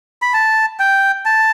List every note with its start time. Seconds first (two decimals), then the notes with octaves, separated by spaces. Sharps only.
0.22 B5
0.34 A5
0.79 G5
1.25 A5